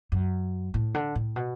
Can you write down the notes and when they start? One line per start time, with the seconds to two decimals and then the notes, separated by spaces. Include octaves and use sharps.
0.12 F#2
0.74 A2
0.95 D3
1.15 A2
1.36 B2